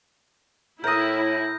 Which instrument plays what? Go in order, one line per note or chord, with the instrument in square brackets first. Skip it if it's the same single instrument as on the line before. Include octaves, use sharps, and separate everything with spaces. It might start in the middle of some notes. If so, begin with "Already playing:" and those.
[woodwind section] A2 [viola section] E4 [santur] A#4 D#6 [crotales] G6 A#6